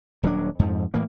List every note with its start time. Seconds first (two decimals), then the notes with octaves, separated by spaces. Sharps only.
0.23 D#1 F#3 C#4 D4
0.59 F2 G#2 F3
0.94 A2 E3 A#3